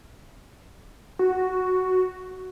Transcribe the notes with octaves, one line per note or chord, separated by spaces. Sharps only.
F#4